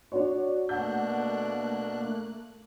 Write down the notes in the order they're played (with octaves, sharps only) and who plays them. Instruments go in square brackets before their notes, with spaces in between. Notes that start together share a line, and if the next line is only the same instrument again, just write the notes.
[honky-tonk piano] D4 F#4 C#5
[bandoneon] B2 D4 [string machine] A3 A#3 F#6 [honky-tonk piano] F#5 G6